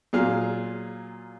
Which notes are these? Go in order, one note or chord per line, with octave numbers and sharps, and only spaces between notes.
A#2 F#3 F4 G#4 F5 F6